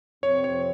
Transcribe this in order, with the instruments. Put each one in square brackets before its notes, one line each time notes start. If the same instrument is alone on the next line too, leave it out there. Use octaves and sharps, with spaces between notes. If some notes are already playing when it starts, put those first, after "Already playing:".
[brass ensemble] F2 C3 F3 C4 [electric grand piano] C#5
[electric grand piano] C#5